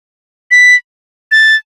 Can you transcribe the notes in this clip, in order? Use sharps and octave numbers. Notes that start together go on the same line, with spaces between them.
B6
A6